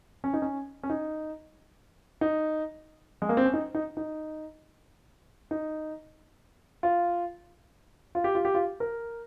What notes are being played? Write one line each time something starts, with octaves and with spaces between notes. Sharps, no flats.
C#4
D#4
C#4
C#4
D#4
D#4
G#3
A#3
C4
C#4
D#4
D#4
D#4
D#4
F4
F4
G4
F4
G4
F4
A#4